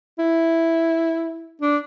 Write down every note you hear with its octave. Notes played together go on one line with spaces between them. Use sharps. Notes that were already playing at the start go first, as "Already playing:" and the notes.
E4
D4